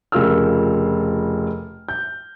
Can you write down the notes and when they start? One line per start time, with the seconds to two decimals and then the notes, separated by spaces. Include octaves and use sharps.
0.12 F1 C#3 F4 A#4 E6 F6
1.89 G6